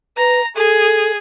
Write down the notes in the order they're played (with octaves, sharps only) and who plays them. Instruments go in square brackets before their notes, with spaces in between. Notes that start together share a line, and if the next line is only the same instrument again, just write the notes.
[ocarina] B4 [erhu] A#5
[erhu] G#4 [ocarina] A4